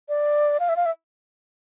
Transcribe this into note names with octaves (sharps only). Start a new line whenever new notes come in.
D5
F5
E5
F5
E5